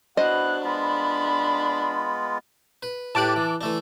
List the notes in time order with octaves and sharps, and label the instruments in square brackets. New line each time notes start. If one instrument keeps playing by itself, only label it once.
[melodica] B3 E4 [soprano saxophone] D4 [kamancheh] F#4 F#6 [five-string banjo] C5 D#5
[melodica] G#3 B3 F4 [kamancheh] B5
[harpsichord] B4
[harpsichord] A2 G4 B4 [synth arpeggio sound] A5 D6 F#6
[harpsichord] E3
E3 A3 D4